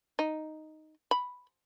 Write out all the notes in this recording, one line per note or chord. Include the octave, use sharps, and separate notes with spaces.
D#4
B5